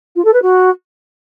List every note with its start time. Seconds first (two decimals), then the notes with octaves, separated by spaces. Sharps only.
0.16 F4
0.24 A4
0.33 B4
0.42 F#4